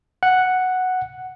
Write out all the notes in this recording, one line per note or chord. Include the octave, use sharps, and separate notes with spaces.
F#5